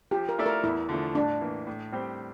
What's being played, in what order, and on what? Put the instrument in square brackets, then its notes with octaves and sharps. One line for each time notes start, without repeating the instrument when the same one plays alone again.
[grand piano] F3 [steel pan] G4
[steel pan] A#4
[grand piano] A3 E4 A4 D5
[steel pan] A#4
[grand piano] E2 [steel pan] E4
[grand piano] D3 F3 A3
[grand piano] A2 [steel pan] D4
[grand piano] E3 A#3
A2
G3 C4 G4 C5